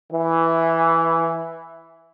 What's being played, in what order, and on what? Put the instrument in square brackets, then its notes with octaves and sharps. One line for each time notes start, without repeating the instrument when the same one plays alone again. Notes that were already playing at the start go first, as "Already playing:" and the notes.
[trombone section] E3